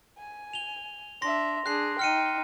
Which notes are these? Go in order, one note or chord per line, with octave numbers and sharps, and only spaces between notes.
G#5
F7 G7
D4 E5 C6 A#6
D4 G#4 F#6 C7
D#4 G5 F6 C#7 D#7